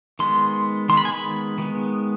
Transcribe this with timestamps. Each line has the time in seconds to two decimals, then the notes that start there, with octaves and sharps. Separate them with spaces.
0.19 D#3 G#3 B3 C6
0.89 D#3 G#3 B3 C6
0.97 B5
1.05 G#5
1.12 B5
1.58 D#3 G#3 B3